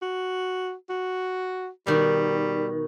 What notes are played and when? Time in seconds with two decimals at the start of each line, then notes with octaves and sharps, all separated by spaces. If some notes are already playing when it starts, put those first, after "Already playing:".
0.02 F#4
0.89 F#4
1.87 B2 D#3 G3